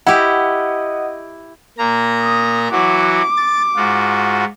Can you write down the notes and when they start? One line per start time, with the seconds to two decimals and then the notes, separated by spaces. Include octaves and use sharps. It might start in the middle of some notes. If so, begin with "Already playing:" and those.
0.07 E4 G4 D#5 F#5
1.78 A#2 A#3 A#5
2.23 D#6
2.71 E3 F#3 F#4 D6
3.37 A6
3.76 G#2 F4 F#4